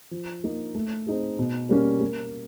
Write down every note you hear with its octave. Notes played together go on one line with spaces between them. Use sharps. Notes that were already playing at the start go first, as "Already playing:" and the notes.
F3
A#3 D#4
A3
C4 D#4 G#4
B2
G3 A#3 C#4
A#3